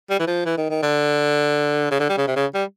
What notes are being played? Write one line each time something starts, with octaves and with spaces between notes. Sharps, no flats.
G3
E3
F3
E3
D#3
D#3
D3
C#3
D3
G3
C#3
C3
C#3
G3